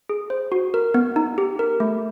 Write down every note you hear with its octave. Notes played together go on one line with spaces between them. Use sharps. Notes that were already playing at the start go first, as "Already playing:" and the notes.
G#4
C5
F#4
A#4
B3
D#4
G4
A#4
A3